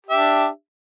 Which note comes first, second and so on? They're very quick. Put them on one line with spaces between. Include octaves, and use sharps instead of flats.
G4 E5 D4